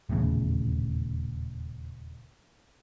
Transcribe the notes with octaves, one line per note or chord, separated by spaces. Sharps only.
D#1 E2 A2 C#3